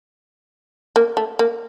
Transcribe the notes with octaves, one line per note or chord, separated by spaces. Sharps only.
A#3
A3
A#3